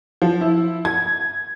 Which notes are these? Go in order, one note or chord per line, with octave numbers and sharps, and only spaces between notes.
F3
E4
G#6